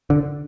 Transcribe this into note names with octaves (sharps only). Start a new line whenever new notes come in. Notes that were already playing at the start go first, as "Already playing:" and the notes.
D3